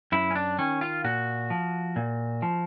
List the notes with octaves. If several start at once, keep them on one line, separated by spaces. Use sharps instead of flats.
F#2 E4
C#4
D4
D#3 C#4
F4
A#2 F#4
F3
A#2
F3